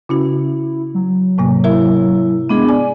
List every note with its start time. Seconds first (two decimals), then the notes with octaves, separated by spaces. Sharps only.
0.09 C#3 C#4 E4 F#4
0.94 F#3
1.38 G#2 C3 A#3
1.64 E4 A#4 E5
2.49 G#3 B3 D4 G#4
2.69 D5 G#5 D6